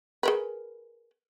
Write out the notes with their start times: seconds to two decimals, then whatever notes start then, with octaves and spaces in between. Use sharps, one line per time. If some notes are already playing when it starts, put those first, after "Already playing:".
0.23 G#4 A#4 B4